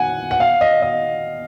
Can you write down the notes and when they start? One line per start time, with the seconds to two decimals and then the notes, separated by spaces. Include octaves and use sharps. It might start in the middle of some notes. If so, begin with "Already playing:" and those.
Already playing: F#5 G#5
0.31 F#5
0.40 F5
0.61 D#5
0.82 D#5